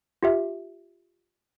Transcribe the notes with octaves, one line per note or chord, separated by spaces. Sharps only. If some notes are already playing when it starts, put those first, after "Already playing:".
F4 G4 E5